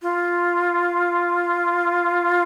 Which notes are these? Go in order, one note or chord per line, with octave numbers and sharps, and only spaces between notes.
F4